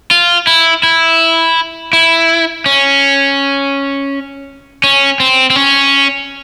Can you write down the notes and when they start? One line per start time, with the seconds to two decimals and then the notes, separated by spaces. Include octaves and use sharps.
0.11 F4
0.47 E4
0.83 E4
1.93 E4
2.66 C#4
4.84 C#4
5.20 C4
5.50 C4
5.56 C#4